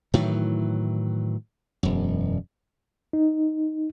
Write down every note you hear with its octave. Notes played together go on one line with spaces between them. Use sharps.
A2 D#3 E3 F#3
E1 F#2
D#4